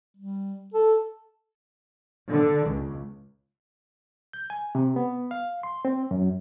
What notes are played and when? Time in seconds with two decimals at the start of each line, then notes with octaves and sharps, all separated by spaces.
0.16 G3
0.74 A4
2.30 D3
2.66 C#2
4.33 G6
4.50 G#5
4.75 C3
4.96 B3
5.31 F5
5.63 C6
5.85 C4
6.11 F#2